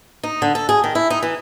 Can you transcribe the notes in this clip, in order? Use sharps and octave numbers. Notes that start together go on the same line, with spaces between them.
D#4
D3
A4
G#4
D#3
E4
D#4
E3